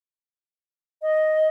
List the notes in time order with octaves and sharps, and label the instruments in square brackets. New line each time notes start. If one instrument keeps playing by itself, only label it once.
[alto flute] D#5